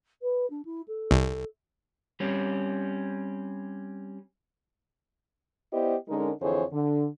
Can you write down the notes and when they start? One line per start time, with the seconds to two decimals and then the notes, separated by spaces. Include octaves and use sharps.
0.22 B4
0.50 D4
0.65 E4
0.88 A4
1.11 C2
2.20 G3 C4 C#4
5.72 B3 E4 G4 C5 D5 D#5
6.08 D3 G#3 C#4 D#4 A#4
6.41 F2 D3 E3 G#4 C5 C#5
6.73 D3